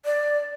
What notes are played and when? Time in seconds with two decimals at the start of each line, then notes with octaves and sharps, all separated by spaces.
0.05 D5